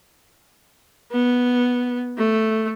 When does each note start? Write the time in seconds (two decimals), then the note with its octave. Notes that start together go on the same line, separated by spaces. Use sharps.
1.11 B3
2.18 A3